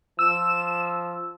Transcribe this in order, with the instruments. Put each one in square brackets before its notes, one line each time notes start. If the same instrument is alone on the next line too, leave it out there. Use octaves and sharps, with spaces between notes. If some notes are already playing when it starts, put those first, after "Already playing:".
[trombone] F3 [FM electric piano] E6 [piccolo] E7